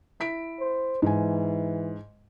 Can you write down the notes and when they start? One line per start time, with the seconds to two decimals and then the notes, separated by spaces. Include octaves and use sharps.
0.20 E4 B6 D7
0.59 C5
1.02 G#2 E3 G#5